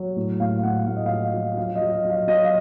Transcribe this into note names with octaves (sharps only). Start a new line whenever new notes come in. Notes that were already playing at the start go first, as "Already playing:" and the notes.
Already playing: F#3
A2
A2 F5
A2 F#5
A2 F5
D#5
F3 F5
F3
F#3 F5
D#5
F#3
F5
F#3
F5
F#3 D#5
F5